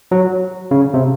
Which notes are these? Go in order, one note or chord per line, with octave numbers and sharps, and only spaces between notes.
F#3
C#3
C3